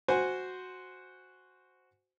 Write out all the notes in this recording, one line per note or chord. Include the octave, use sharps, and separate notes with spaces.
F#4 C5 G#5